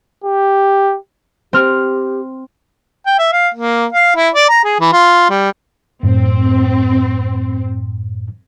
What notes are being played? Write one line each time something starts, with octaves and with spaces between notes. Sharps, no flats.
G4
C4 G4 F6
G5
E5
F5
A#3
F5
E4
D5
A#5
G#4
E3
F4
G3
F#2 A2 C4